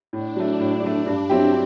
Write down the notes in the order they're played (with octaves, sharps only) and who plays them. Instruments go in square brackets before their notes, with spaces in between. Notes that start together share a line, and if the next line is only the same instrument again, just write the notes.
[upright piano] A2 [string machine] D4
[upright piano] F#3 A3
A2
F#3 A3
G2
F#3 C4 E4 G4